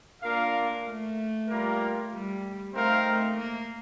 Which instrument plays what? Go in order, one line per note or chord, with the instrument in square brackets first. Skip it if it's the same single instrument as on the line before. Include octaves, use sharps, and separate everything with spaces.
[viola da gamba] A#3 [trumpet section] D4 F4 A#4 F5
[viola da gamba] A3
[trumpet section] G3 A#3 F4 A#4
[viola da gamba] G3
[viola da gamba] A3 [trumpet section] C4 D#4 A#4 F5
[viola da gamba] A3
A#3